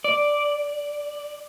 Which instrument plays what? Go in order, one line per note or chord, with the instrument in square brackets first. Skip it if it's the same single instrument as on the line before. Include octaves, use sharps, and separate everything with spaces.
[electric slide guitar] D5